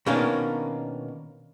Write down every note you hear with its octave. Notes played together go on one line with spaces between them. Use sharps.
B2 D#3 A#3 C#4 D4